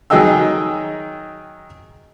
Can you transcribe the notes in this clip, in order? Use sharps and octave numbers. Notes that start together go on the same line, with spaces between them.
D#3 F#3 G#4 D#5 G5 E6